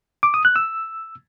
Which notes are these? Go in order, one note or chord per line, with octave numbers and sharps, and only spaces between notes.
D6
D#6
F#6
E6